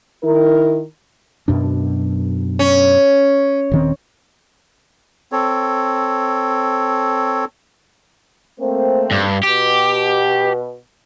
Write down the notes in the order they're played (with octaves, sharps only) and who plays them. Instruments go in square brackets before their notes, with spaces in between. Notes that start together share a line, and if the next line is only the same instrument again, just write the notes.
[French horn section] D#3 E4 A#4
[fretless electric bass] F#2 B2 D4
[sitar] C#4
[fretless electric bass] D#1 D#3 C4
[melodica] C4 A4 C#5
[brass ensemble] A3 A#3 C4
[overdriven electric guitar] G2
[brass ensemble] B2 [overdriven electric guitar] G4